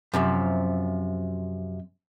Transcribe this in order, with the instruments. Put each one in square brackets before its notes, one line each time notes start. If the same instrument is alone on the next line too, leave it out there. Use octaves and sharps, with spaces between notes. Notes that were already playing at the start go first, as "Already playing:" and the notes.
[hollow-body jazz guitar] F#2 C3 D#3 F3